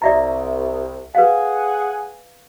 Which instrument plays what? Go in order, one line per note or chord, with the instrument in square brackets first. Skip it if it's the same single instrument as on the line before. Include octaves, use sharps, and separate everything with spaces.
[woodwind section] C2 [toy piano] D5 E5 A#5
[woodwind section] G#4 F#5 G#5 [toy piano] B4 F5